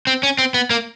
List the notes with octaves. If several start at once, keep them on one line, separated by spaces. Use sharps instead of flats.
C4
C#4
C4
B3
A#3